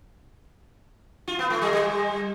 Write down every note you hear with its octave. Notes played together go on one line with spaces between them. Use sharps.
F4
B3
A3
G3
G3